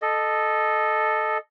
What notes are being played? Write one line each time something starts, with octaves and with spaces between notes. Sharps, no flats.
A4 D#5